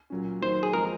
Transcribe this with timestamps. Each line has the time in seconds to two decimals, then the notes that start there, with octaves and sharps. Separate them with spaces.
0.10 A#2 F#3 C#4
0.42 D#3 F#3 A#3 D#4 C5
0.63 G#4
0.73 F3 G#3 C4 A#4